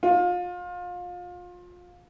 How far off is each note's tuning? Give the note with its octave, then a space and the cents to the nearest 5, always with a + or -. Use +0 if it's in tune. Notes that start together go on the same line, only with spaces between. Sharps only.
F4 +30